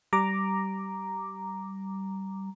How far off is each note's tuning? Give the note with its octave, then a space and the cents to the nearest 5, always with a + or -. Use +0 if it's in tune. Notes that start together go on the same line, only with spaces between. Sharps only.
G3 -20 A#5 +0 D6 +0